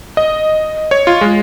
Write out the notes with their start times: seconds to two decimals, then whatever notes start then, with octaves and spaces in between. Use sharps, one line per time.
0.17 D#5
0.91 C#5
1.07 F4
1.21 G#3